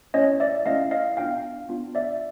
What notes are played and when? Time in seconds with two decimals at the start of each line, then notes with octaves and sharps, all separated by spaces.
0.14 A3 C#4 E4 C#5 D#5
0.40 D5 E5
0.66 A3 C#4 E4 D#5 F5
0.91 D#5 F5
1.17 B3 D4 F4 F5 G5
1.69 B3 D4 F4
1.95 D5 E5